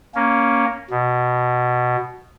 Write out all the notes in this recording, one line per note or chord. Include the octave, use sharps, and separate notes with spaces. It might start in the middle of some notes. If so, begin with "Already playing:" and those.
A#3 C#4
B2